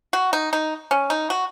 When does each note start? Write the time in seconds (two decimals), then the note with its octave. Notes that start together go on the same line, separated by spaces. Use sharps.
0.13 F#4
0.33 D#4
0.53 D#4
0.91 C#4
1.10 D#4
1.30 F#4